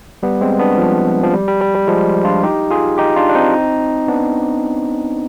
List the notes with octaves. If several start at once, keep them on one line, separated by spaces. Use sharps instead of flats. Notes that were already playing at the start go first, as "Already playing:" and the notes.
G3 B3
G#3 C4
B3 D4
F3
F3
G3
G3
G3
G3
F3 G#3
D4 F4
D#4 G4
F4 G#4
D#4 G4
D4 F4
D4
C4 D#4
B3 D4